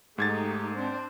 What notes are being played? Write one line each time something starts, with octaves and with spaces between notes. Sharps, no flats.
G#2 A3 D#4 G4 G#6 A6
C4 D4 C5